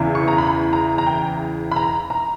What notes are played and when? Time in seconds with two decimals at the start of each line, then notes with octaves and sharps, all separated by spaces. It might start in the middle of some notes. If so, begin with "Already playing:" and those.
Already playing: E2 C#3 E3
0.15 C#6
0.28 A#5
0.38 B5
0.73 A#5
0.98 A#5
1.06 G5
1.72 B5
1.76 A#5
2.10 A#5